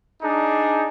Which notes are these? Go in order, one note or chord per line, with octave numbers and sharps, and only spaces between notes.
D4 D#4 G#4